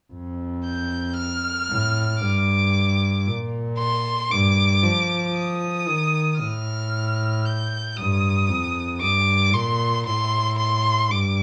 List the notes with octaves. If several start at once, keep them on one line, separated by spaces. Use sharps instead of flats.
F2
G6
F6
A2
G2 D6
A#2
C6
G2 D6
F3
D#6
D#3
A2 F6
G6
G2 D#6
F2
G2 D6
A#2 C6
A2 C6
C6
G2 D6